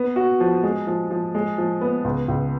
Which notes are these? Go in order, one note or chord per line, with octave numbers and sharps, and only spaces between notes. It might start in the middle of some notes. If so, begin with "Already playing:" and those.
Already playing: B3
F#4
F3
G#3
F3
F3
G#3
F3
B3
C#2
C#2